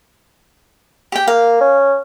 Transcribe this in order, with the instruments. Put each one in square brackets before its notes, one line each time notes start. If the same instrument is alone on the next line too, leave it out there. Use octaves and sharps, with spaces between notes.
[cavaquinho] G4 G5
[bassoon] A#3 [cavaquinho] F5
[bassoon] C#4